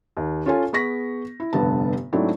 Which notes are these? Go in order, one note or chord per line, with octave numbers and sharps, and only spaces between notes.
D#2
C#4 F4 A4 C#5 G#5
B3 G#4 C#6 A#6 B6
E4
F1 G2 D3 B3 A5
G#2 F#3 A3 C4 D4 E4